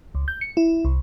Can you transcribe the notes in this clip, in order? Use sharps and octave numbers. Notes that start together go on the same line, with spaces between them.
C#2
G6
C#7
E4
C2